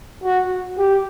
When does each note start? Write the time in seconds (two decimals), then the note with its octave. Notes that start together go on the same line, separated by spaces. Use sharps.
0.23 F#4
0.78 G4